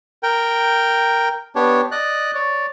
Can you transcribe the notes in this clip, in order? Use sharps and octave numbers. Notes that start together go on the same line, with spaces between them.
A#4 G5
B3 D4 G4 C#5
D5 D#5 F#6
C#5 D5